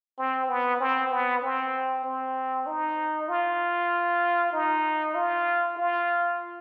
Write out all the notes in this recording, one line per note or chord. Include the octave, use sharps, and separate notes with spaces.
C4
B3
C4
B3
C4
C4
D#4
F4
D#4
F4
F4